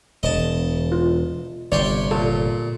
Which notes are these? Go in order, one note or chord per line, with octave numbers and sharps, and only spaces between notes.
E1 D#5 A5
F4
G1 C3 C#5 D5 G5 C6
A#2 A4